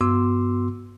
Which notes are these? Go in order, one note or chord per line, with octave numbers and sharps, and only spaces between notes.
G2 B3 F#4 C6 D6 E6